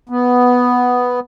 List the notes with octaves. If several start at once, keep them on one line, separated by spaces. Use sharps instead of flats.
B3